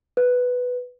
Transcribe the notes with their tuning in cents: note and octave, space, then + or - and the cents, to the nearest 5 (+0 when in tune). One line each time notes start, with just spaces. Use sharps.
B4 +5